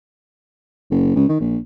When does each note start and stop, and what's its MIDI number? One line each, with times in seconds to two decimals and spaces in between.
0.91 1.15 30
1.16 1.26 37
1.29 1.36 51
1.41 1.58 34